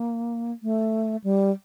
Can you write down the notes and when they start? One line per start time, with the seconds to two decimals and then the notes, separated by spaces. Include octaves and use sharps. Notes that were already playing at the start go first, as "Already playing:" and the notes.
Already playing: A#3
0.63 A3
1.24 G3